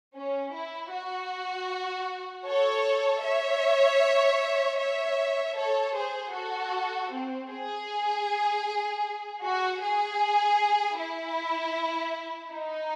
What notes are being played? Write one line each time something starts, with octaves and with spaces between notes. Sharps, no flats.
C#4
E4
F#4
A4 C#5
C#5 E5
C#5 E5
A4 C#5
G#4 C5
F#4 A4
C4
G#4
F#4
G#4
E4
D#4